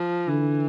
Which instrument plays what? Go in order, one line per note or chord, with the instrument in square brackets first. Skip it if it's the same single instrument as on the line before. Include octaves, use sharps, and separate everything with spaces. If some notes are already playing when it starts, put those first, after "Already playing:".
Already playing: [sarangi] F3
[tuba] D3 [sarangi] E3